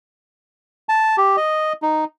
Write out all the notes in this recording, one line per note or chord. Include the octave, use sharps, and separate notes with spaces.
A5
G4
D#5
D#4